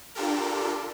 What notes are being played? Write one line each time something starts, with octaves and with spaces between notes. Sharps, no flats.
D4 F4 G4 A4 A#4